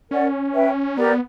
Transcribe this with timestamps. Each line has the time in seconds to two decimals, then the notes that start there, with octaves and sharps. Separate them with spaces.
0.11 C#4 A#4 D5 F#5
0.54 B4 E5 G5
0.97 B3 G4 A#4 D5 A#5